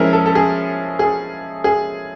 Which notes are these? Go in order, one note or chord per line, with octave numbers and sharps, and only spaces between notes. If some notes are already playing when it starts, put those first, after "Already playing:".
Already playing: F3 G#3 C#4 E4 A#4
A4
A4
G#4
G#4
G#4